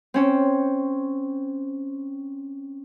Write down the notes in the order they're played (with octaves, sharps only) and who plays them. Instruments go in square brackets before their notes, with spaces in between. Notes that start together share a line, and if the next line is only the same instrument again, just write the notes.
[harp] C4 C#4